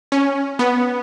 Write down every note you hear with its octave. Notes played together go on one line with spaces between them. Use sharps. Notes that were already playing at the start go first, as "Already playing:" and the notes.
C#4
B3